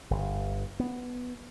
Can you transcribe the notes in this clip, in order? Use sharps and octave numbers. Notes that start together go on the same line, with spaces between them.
G1
B3